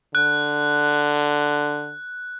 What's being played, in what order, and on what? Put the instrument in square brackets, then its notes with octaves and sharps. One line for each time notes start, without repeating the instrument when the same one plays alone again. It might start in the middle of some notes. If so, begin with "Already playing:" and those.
[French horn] D3 [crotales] F#6